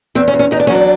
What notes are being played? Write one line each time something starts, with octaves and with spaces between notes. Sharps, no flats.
E2 C4
C#4
E2
C#4
E2 D#4
D4
C#4
F#3 D4